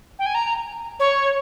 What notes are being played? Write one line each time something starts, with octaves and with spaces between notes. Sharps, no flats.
G5
G#5
A#5
C#5